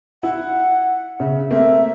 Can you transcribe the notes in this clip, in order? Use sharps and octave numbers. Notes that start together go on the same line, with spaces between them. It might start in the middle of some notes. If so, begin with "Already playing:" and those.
E4 F#5
C#3 E5
A3 A#3 C4 E5